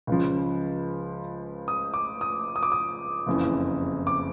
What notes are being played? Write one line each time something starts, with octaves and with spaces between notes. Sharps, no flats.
C#2 C#3 F3
D#6
D6
D#6
D#6
D6
D#6
F#1 F2 C#3 E3
D6